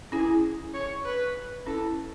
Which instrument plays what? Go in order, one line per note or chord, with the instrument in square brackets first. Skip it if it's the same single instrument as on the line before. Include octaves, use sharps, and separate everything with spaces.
[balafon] C#4 E4 [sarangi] G#4
[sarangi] C#5
B4
[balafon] C#4 E4 [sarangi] A4